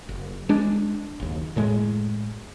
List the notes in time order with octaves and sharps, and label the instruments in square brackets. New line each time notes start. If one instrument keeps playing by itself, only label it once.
[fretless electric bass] F#1
G#3 D4
F#1 D#2
F#2 A2 G#3